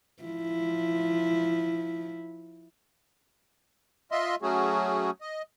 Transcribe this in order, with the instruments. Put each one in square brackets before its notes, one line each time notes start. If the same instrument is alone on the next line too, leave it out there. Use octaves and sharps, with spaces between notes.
[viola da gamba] F3 E4
[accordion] F4 D#5 E5 C6
F#3 A3 C#4 F#4 G#4
D#5